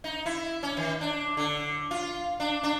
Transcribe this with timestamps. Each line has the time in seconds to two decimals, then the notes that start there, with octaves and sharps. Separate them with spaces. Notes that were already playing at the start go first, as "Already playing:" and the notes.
0.04 D#4
0.26 E4
0.63 C#4
0.77 D#3
1.01 D4
1.37 D3
1.91 F4
2.40 D4
2.63 D4